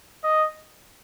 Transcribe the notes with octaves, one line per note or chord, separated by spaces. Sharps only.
D#5